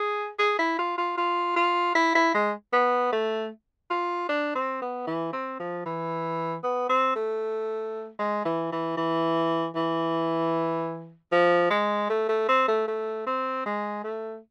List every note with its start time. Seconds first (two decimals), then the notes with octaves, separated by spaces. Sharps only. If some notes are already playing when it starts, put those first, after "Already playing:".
Already playing: G#4
0.39 G#4
0.59 E4
0.79 F4
0.98 F4
1.18 F4
1.56 F4
1.95 E4
2.15 E4
2.34 G#3
2.73 B3
3.13 A3
3.90 F4
4.29 D4
4.55 C4
4.82 B3
5.07 E3
5.33 C4
5.60 F3
5.86 E3
6.64 B3
6.89 C4
7.16 A3
8.19 G#3
8.45 E3
8.72 E3
8.97 E3
9.75 E3
11.32 F3
11.70 G#3
12.10 A3
12.29 A3
12.49 C4
12.68 A3
12.88 A3
13.27 C4
13.66 G#3
14.04 A3